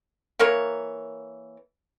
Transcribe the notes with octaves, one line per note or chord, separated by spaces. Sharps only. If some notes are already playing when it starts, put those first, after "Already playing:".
E3 A#3 A#4 C#5